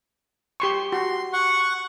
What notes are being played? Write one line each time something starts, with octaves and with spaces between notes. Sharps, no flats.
G4 C6 C#6
F#4 C6
F#5 C#6